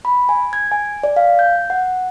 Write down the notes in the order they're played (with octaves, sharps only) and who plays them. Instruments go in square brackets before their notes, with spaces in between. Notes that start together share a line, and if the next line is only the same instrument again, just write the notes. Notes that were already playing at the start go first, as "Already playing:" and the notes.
[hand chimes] B5
G#5
G#6
G#5
D5
F5
G6
F#5